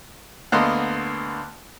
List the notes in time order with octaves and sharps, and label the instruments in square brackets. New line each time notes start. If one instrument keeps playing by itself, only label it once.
[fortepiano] D2 D3 A#3 B3 D#5 C6